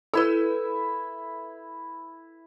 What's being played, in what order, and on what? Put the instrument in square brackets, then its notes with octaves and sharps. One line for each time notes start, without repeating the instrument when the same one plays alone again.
[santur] E4 E6 [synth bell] A4 B4